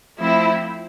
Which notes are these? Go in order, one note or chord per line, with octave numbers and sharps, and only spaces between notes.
F3 A3 C4 E4